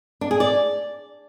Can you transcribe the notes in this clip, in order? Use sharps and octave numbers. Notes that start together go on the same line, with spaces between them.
D4
G#4
D5